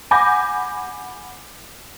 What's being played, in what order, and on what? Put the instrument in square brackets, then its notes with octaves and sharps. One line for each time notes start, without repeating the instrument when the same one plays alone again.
[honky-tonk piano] F#5 G#5 B5 D6 G6 A#6